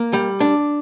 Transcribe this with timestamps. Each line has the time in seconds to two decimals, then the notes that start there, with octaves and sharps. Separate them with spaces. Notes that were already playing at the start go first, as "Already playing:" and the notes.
Already playing: A#3
0.13 G3
0.40 D4